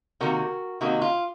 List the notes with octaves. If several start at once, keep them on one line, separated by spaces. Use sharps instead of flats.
C3 D#3 A#3 F#4 A#4
C3 D#3 A#3 D#4 F#4
F4